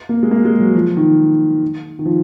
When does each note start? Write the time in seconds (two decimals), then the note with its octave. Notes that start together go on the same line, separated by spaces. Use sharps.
0.09 A#3
0.23 G#3
0.31 A#3
0.45 G#3
0.60 F#3
0.75 F3
0.97 D#3
1.99 D#3
2.05 F3